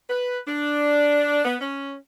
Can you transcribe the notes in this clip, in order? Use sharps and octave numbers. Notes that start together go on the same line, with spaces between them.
B4
D4
B3
C#4